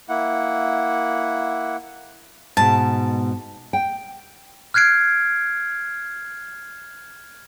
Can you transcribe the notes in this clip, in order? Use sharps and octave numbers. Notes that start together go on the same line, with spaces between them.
A#3 E4 F#5
G#2 B2 A5
G5
F6 F#6 G#6 C7 D7